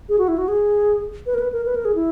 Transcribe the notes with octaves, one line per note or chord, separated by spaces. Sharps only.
G#4
F#4
E4
F#4
G#4
B4
A#4
B4
A#4
B4
A#4
G#4
E4